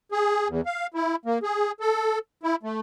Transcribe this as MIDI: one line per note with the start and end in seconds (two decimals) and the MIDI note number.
0.12 0.48 68
0.48 0.61 40
0.66 0.87 77
0.94 1.16 64
1.26 1.38 58
1.43 1.72 68
1.80 2.19 69
2.43 2.56 64
2.63 2.80 57